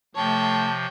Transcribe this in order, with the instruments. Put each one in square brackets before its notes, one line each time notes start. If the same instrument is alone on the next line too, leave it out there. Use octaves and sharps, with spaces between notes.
[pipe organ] C3 F3 [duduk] A3 [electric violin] C#5 G5 [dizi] A5